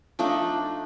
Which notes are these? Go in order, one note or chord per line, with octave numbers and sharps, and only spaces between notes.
F3 A3 D4 D#4